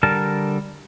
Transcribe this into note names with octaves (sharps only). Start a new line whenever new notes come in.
D3 G3 A#4 A5 F6